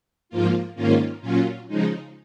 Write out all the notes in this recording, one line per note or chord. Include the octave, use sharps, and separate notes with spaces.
G#2 F3 A#3 F4
G#2 D#3 A#3 C#4 F4
A#2 F#3 C#4 F4
C#3 F3 G#3 D#4